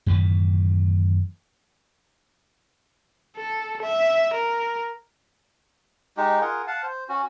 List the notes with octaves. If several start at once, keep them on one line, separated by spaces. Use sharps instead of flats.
F#2 A2 D#3 E3
A4
E5
A#4
G#3 D#4 G4
F4 G#4 A#4 F#5
F5 F#5 A5
C5
C#4 F#4